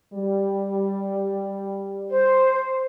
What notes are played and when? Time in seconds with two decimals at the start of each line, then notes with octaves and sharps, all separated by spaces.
0.14 G3
2.10 C5